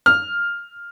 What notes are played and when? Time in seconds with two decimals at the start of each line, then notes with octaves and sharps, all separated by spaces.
0.06 F6